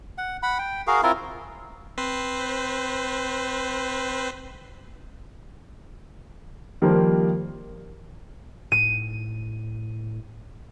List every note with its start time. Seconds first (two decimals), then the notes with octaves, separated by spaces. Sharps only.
0.18 F#5
0.43 F#5 B5
0.59 G5
0.87 F#4 G#4 A#4 F5
1.03 C4 E4 F4 A#4
1.98 C4 B4 C5
6.82 D#3 F3 G3 A#3 A#4 C5
8.72 A2 D#7